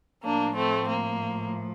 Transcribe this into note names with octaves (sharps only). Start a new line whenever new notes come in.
A2 F3 A#3 D4
A3 C4
A#3